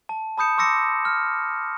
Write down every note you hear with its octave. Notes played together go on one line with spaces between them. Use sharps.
A5
A5 B5 D#6 G6 C#7 E7
C6 D6 E6 A#6 C#7 E7
F6